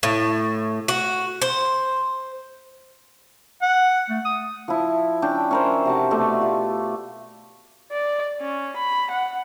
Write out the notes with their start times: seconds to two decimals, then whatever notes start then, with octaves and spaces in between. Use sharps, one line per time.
0.03 A2
0.88 F#4
1.42 C5
3.62 F#5
4.10 A3
4.25 D#6
4.68 F3 E4
5.22 C#4 D4 G5
5.51 C#4 A#4 C5
5.85 C3 F#4 A5
6.11 B2 A3 A4 D5
6.41 F4
7.91 D5
8.41 C#4
8.76 B5
9.11 F#5